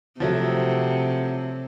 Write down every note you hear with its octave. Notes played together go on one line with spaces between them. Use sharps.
C3 F3 F#3 A3